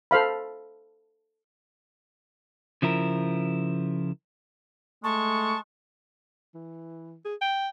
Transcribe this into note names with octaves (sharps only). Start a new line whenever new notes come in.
A4 C5 F5 B5
C#3 F3 E4 A#4
G#3 A3 A5 C#6
E3
G#4
G5